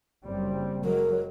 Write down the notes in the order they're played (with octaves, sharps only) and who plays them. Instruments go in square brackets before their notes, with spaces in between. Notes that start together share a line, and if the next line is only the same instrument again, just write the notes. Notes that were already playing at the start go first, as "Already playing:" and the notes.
[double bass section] F#1 G3 C4
[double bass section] F#3 G#3 [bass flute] A#4